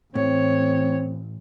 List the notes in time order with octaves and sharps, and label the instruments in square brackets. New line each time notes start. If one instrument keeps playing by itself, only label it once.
[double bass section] A1 [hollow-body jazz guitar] A2 [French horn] C4 [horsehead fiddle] C#5